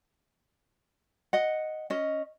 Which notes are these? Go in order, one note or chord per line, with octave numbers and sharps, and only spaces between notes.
D#5 F#5
C#4 D#5